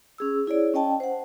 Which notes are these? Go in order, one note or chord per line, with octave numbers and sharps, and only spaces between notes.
C#4 G#4 E6
E4 G#4 C#5 D5
C#4 D#5 G5 A5
C5 F#5